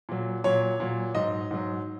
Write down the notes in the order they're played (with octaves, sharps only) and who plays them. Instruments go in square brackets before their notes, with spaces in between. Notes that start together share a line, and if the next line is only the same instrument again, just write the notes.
[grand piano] A#2 F#3
A#2 F#3 C#5
A#2 F#3
G#2 F#3 D#5
G#2 F#3